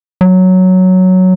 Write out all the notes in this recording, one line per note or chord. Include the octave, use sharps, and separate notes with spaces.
F#3